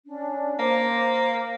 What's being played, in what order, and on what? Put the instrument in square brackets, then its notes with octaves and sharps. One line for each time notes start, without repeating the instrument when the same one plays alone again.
[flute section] C#4 D4
[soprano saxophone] A#3 [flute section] C5 A#5 D6